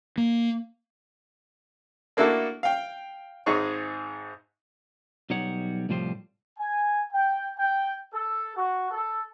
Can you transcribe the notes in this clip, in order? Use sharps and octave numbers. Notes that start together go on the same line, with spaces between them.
A#3
A3 A#3 D4 E4 F#4 A4
F5 G5
G#1 G#2 D#4 G#4 C#5 C#6
B1 G3 D#4 C#5 F#5
C2 A2 F3 G3 C5
G#5
G5
G5
A4
F#4
A4